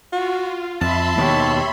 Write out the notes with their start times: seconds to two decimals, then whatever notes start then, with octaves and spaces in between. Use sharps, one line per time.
0.12 F4 F#4
0.81 F2 E5 A5 B5 C6
1.18 D#2 B2 D#3 G4 C#5